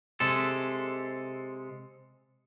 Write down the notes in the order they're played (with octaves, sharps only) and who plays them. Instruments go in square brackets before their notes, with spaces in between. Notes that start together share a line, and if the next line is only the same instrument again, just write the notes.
[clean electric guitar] C3 G#3 A4